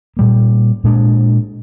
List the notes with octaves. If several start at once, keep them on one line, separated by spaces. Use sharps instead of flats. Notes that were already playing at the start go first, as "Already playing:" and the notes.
A#2 G3 A#3
A#2 G#3 D4